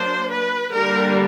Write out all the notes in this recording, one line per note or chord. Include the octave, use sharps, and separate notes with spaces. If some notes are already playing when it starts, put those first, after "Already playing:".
Already playing: F#3 A#3 D4 C5
B4
D3 G3 A#3 D4 A#4